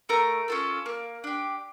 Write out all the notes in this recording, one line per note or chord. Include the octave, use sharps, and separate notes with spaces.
A3 A#4
C#4 F4 A4
A#3
D4 G4